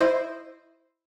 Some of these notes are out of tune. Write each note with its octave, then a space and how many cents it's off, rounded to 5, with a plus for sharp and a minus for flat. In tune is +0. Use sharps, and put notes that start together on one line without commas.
E4 +0 C5 +0 D#5 -15